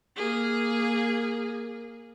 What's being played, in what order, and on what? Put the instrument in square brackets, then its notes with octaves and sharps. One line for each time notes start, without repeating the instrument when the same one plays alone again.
[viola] A#3 G#4